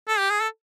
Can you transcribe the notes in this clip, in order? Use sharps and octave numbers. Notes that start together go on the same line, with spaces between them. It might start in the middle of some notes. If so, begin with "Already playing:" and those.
A4
G4
G#4
A4